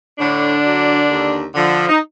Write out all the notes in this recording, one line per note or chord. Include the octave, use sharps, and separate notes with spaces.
A2 D3 D4
F#3
D#2
D3 F3
D#4